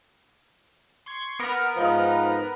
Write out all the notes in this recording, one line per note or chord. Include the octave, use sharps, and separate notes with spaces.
C6 C#6 G#6
B3 A#4
G#2 F3 D#4